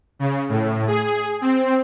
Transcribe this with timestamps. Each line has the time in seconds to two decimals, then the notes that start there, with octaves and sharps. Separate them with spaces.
0.19 C#3
0.49 A2
0.87 G#4
1.41 C4